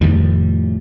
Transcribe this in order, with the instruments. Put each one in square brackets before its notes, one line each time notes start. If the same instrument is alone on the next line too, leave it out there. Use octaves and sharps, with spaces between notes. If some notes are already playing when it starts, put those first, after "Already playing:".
[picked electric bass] F1 D#3 [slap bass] A2 F3 G3